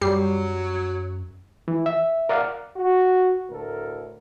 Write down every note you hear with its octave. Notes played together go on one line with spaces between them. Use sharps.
F#2 F#3 G3 C7
E3
E5
A#4 D5 F5 F#5
F#4
D2 A2 A4 A#4